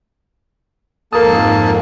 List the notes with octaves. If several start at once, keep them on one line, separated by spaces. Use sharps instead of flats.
F2 G#2 A#3 A4 A#4 A5 D#6